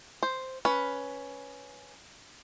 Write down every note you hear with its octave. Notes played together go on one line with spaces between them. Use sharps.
C5
C#4 B4